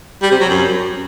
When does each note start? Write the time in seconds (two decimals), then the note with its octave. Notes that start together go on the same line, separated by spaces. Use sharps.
0.22 G3
0.31 C3
0.40 F#3
0.50 F#2